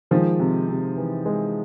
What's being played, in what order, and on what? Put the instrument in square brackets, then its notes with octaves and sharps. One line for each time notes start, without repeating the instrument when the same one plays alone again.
[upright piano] D#3 F3 [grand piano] G#3
[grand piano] C3
C3
E3
G#3